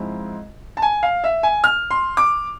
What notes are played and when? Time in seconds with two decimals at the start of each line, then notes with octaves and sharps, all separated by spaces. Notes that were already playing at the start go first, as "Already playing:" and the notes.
Already playing: G#2 F3 G#3 C4 E4
0.77 A5
0.82 G#5
1.03 F5
1.24 E5
1.43 G#5
1.64 F6
1.91 C6
2.17 D6